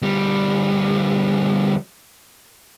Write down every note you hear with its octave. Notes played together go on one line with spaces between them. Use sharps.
D2 G3